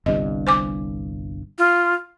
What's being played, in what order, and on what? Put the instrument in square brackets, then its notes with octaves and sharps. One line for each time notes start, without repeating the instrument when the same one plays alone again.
[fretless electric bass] G1 C2 G2 [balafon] D#5
[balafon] C5 G#5 D6
[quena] F4